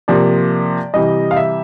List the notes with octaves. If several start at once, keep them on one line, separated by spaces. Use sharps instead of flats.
C3 F3 A#3 D5
C3 E3 G3 D#5
F5
E5